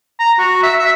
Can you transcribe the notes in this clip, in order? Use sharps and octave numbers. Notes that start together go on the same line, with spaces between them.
A#5
F#4
E5
E5